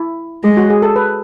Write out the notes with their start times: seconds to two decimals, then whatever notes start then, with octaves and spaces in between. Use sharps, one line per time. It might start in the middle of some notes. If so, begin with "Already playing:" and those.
Already playing: E4
0.43 G#3 G#4
0.57 F#4
0.70 G#4
0.82 A4
0.96 B4